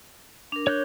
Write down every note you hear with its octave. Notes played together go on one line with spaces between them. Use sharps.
D4 A#4
C#5 F#6 G6